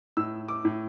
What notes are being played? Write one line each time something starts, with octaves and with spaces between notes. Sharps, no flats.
A2 E6
D6
A2